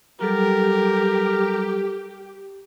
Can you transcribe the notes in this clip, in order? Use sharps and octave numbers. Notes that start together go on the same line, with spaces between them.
F#3 G3 G4 A4 A#4